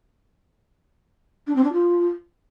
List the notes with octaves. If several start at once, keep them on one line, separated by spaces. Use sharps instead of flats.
D4
C4
D4
F4